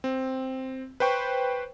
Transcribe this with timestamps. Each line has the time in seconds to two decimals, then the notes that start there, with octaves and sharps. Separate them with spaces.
0.04 C4
1.00 B4 C5 G5 C#6